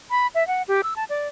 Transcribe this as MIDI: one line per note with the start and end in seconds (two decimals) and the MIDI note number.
0.11 0.27 83
0.35 0.46 76
0.48 0.62 78
0.68 0.81 67
0.83 0.94 88
0.96 1.04 81
1.09 1.28 74